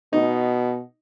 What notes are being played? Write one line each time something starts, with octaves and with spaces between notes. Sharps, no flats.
B2 D#4